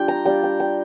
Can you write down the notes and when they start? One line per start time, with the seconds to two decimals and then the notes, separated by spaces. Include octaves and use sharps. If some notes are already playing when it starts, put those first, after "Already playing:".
Already playing: G3 D4 F4 G5
0.08 A#5
0.25 G3 D4 F4 G5
0.44 G5
0.60 G5